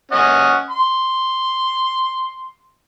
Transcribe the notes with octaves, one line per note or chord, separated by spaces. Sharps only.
C#4 D#5 F#5
C6